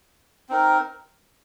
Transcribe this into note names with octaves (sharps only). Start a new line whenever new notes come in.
C4 D#4 A#4